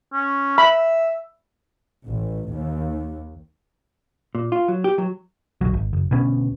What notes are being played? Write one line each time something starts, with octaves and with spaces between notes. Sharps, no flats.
C#4
E5 B5
A1
D#2
A#2
F4
F#3
G4
F#3
D1 B1 F#3
G#1
F#1
D2 B2 B3 C#4